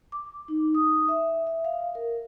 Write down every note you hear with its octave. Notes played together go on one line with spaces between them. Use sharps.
D6
D#4
D#6
E5
E5
F5
A#4